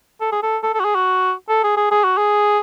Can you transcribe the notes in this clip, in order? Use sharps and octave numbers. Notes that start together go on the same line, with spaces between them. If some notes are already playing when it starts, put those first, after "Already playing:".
A4
G#4
A4
A4
A4
F#4
G#4
F#4
A4
G#4
G#4
G#4
F#4
G#4